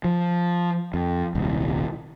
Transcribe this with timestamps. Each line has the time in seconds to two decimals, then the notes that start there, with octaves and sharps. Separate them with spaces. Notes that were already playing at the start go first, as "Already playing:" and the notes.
0.04 F3
0.94 F2
1.35 D#1 C2